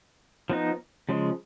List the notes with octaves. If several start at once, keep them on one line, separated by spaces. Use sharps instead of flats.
F3 B3 D#4
C#3 F3 G#3